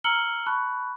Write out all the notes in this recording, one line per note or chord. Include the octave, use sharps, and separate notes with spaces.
A#5 E6 F6 C#7 F#7 G7
A5 B5 C#6 F#6